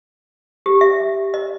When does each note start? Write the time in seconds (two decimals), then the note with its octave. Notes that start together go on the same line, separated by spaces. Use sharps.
0.66 G4
0.81 E5
1.34 D#5